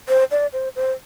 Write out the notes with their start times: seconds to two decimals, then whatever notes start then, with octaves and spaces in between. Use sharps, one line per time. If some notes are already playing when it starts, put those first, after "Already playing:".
0.09 C5
0.31 D5
0.53 C5
0.76 C5